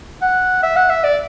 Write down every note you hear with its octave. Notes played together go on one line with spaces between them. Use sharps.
F#5
E5
F#5
E5
D5